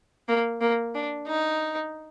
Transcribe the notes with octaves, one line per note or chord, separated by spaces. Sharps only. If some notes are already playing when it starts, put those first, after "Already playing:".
A#3
A#3
D4
D#4